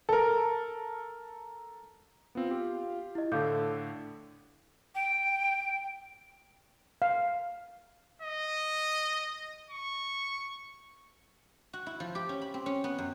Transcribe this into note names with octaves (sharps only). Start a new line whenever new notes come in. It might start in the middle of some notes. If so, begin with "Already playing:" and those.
A4 A#4
B3 C4 F4
G4
E4 D#5
A2 D3 A4 F5 D6 G6
G5
F5
D#5
C#6
F#4
E4
F3
G4
C#4
B5
C4
C#4
B3
F#2